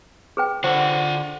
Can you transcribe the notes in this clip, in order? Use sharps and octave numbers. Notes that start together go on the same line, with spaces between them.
G#4 B4 G5
D3 F4 C5 F#5